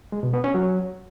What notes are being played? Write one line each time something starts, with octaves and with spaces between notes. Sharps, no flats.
G#3
B2
B3
C#4
F#3